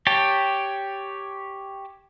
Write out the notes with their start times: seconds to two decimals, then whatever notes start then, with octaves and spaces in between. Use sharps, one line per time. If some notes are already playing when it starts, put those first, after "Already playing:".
0.07 G4 C#5 G5 A5